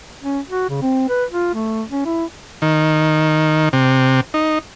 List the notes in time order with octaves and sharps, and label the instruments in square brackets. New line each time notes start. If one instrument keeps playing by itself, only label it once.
[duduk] C#4
F#4
C#3
C4
B4
F4
A3
C#4
E4
[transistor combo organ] D#3
C3
D#4